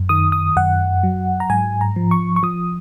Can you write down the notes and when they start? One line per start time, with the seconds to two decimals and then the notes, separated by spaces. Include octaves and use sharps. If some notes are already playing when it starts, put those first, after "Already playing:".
Already playing: F#2
0.09 D#3 D#6
0.32 D#6
0.57 F#2 F#5
1.03 F#3
1.40 A#5
1.50 G#2 G#5
1.81 A#5
1.96 F3
2.11 C#6
2.36 C#6
2.43 F3 D#6